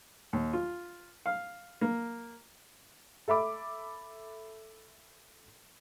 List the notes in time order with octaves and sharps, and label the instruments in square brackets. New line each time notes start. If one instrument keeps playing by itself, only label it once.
[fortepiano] D#2
F4
F5
A#3
[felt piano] A4 E5 B5 D6